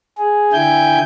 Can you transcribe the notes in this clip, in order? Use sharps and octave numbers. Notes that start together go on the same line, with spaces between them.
G#4
D3 E4 G5 G#5 G6